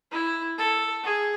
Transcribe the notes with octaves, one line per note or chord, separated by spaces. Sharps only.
E4
A4
G#4